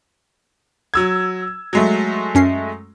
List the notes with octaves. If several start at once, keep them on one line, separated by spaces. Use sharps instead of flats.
F#3 E6 G#6
F#3 G#3 A3
F#2 C#4 C7